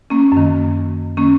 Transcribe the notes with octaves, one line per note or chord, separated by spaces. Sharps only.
A#3 C#4
F#2 D#3
D#3 A#3 C#4